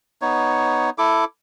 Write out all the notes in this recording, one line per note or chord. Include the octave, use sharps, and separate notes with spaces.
B3 D#4 C#5
E4 A4 D6